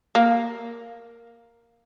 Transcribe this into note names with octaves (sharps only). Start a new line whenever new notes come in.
A#3